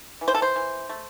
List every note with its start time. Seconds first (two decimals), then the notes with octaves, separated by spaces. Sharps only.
0.21 E3
0.28 C5
0.35 A4
0.42 C5
0.56 E3
0.89 A3